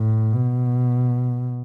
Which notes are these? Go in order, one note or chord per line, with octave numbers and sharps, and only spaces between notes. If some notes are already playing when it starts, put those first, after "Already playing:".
Already playing: A2
B2